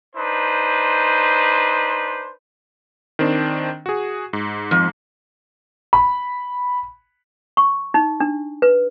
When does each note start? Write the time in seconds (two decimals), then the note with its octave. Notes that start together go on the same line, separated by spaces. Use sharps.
0.16 D4 D#4 B4 C5
3.19 D#3 C4 D4
3.86 F#4 G#4
4.33 G#2
4.71 F2
5.93 B5
7.57 C#6
7.94 D#4
8.20 D4
8.62 B4